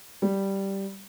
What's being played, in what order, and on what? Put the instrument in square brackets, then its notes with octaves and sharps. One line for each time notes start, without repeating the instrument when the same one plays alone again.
[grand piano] G3